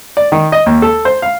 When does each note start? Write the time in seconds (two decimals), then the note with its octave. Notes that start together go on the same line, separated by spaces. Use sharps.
0.17 D5
0.32 D#3
0.52 D#5
0.66 D#2
0.82 A4
1.05 C5
1.22 F5